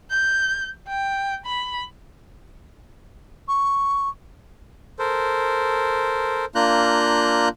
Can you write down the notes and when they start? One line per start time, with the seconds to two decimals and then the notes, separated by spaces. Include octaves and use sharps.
0.10 G6
0.88 G5
1.46 B5
3.48 C#6
4.99 A4 A#4 C5
6.55 A#3 D4 F4 A#5 F#6 G6